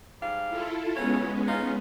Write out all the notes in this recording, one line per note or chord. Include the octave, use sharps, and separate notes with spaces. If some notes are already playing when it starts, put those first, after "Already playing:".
G#2 G3 F5
E4 F4 A4
C#3 G#3 B3 C#4 F#4 C#5
D#4 F4